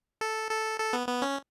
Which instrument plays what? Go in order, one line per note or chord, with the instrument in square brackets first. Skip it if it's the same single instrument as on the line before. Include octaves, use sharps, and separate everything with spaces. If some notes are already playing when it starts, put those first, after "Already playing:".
[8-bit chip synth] A4
A4
A4
B3
B3
C#4